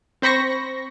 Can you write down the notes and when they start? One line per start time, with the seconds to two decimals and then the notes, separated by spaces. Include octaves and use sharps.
0.22 C4 C5 B5 C#6 A#6